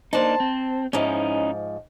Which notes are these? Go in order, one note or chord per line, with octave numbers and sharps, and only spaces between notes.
A#3 D4 D#4 C5 A5
C4
G#2 F3 C#4 D#4 E4